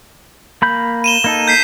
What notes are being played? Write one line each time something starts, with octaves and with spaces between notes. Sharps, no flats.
A#3 B5 G6
D#7 E7 G7
A#3 D#4 A4
G6 B6 C7